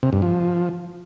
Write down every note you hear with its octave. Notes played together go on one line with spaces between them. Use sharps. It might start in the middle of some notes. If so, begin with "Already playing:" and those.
C3
G2
F3